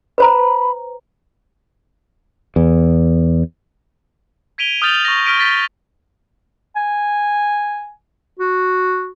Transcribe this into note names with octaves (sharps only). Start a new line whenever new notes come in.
B4 C5 A#5 B5
E2
G#6 B6 D7 D#7 F7 G7
D#6 F6 G6 A6 F7 F#7
C#6 D#6 A#6
C#6 F6 B6 D7 D#7
G6 A6 B6 G7
G#5
F#4